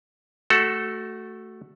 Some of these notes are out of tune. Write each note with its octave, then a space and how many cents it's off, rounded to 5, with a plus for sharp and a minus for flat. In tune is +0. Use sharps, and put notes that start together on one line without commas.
A3 +0 F#4 +15 A4 +0